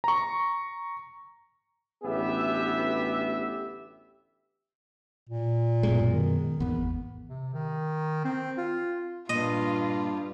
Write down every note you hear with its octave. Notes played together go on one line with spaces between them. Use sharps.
A#5 C#6
A1 D2 B3 G4 E5
A#2
F#2 B2 G#3
D#3
G#1 E2 B3
C3
D#3
C4
F4
G2 A#2 F4 D#5